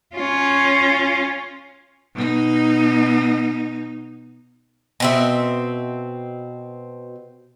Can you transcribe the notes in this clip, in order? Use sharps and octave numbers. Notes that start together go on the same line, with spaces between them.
C#4 F4
B2 D#4
B2 C4 E5